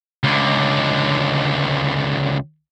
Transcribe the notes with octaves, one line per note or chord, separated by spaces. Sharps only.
C#2 D3